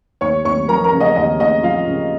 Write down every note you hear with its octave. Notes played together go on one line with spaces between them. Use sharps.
D#2 C#5 C#6
D#2 C#5 C#6
F3 A#4 A#5
A#4 A#5
C#3
D#5
D#2 D#5
D#2 D#5
F3 F4 F5
C#3